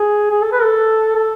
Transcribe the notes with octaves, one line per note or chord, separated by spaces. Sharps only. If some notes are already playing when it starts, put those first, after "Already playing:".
Already playing: G#4
G#4
A4
B4
A4
A4